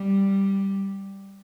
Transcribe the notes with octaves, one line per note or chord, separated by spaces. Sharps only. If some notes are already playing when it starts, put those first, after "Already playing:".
Already playing: G3